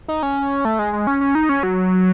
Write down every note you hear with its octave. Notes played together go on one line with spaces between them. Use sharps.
D#4
C#4
A3
G#3
G#3
C#4
C#4
D#4
C#4
F#3